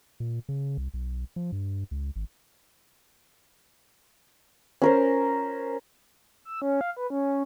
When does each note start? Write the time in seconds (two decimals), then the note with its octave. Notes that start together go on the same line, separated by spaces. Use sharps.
0.20 A#2
0.49 C#3
0.78 C2
0.94 B1
1.36 F3
1.52 G2
1.91 C#2
2.16 G#1
4.82 C#4 A#4 C5
6.45 E6
6.62 C#4
6.81 F5
6.97 B4
7.10 C#4